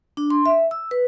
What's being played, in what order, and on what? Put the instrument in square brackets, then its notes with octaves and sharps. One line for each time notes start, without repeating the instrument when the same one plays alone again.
[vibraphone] D4
C6
E5
E6
B4